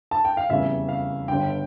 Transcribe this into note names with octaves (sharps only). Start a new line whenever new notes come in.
A5
G5
F5
F1 E2 C#3 G3 C#4 E5
F5
G1 G2 D3 G5